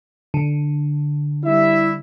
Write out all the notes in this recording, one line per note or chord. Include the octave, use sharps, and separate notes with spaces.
D3
G3 E4 E5